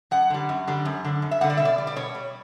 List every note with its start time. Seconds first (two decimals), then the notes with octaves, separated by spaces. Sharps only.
0.11 F#2 F#5
0.30 D3 G3
0.49 F#2
0.67 D3 G3
0.85 F#2
1.04 D3 G3
1.22 F#2
1.31 E5
1.41 D3 G3 F#5
1.50 D5
1.57 B2 E5
1.65 D5
1.78 G3
1.87 D5
1.96 B2 C#5
2.15 G3